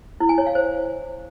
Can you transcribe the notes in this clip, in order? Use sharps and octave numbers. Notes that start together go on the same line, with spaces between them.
E4
G#5
C#5
F5
C5